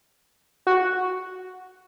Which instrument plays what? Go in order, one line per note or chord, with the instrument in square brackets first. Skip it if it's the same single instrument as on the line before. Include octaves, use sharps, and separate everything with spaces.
[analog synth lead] F#4